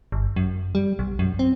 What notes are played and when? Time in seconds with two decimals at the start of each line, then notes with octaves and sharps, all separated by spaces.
0.12 G1
0.36 F#2
0.75 G3
0.99 B1
1.19 F#2
1.39 C4